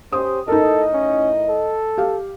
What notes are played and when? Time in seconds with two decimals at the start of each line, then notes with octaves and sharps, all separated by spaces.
0.13 C#4 G4 C5 D#6
0.48 A2 D#4 E4 A4 A#4 D#5
0.93 C#4
1.49 A4
1.98 G4 F5